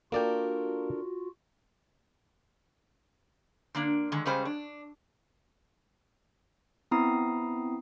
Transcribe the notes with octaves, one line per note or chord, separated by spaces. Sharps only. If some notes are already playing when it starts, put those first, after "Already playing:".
A#3 D4 F4 F#4 A4 A#4 D5 G5
D3 A#3 D4
D3 D#3 G#3
C#3 G3 G#3 C#4 C5
D4
B3 C4 E4 A#5 D#6 C7